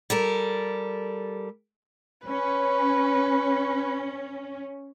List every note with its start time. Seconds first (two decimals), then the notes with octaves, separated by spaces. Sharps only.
0.10 G3 A4 A#4
2.27 C#4 B4